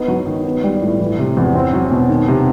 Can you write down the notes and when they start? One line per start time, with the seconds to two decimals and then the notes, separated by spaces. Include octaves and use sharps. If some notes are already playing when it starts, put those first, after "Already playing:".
Already playing: B3 D#4
0.08 F#3
0.27 D#3
0.45 B3
0.63 G3
0.82 A2
0.99 E3
1.19 C3
1.37 E2
1.55 C4
1.73 F#3
1.91 B2
2.09 D#3
2.28 C3